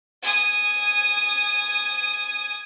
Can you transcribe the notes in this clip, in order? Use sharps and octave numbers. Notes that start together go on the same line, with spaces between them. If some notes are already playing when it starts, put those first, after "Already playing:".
G#5 D#6